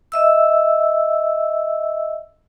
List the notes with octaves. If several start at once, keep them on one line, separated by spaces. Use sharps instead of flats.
D#5 E5 E6